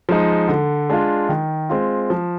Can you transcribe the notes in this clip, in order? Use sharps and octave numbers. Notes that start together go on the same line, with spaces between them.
F3 G#3 D#4
D3
G#3 D4 F4
D#3
G#3 C4 F4
F3